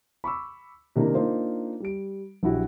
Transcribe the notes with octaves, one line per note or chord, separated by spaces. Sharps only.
B5 C#6 D6 E6
C3 D#3 A#3 D4 E4 A#4
A#3 D4 D#4 F4 C5
G3 D7
A#1 F#3 E4 F#4 G4 F#5